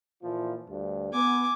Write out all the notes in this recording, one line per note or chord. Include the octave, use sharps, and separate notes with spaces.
A#2 E3 F3
D2 G2
B3 G#5 D6